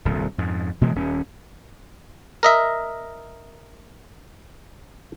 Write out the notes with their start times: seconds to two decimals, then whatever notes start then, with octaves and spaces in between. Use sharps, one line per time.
0.05 D#1 C2 G2
0.38 F2 G#2
0.81 B2 E3 G#3 A#3
0.95 D#1 C#4
2.43 A#4 D#5 E5